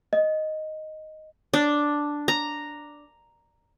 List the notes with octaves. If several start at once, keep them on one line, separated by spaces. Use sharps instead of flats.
D#5
D4
A#5